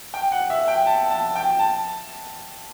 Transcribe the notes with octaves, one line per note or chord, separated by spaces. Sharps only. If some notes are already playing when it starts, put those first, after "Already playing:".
G5
F#5
E5
G5
A5
A5
G5
A5